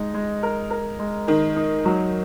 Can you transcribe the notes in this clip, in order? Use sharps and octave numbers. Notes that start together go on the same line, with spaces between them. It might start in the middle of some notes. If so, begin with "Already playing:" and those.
Already playing: G#3 D#4
G#3
A#4
A#4
G#3
D#3 D#4
D#4
F#3